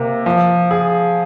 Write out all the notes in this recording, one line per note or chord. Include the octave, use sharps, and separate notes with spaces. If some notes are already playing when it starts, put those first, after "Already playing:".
Already playing: C3 A#3
F3
G#4